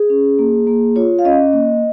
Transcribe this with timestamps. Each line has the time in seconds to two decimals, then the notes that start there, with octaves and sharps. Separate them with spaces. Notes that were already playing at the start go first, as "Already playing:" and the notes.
Already playing: G#4
0.10 C#4
0.39 A#3
0.67 A#3
0.96 F4 C#5
1.19 F5
1.25 C#4 D#5
1.53 A#3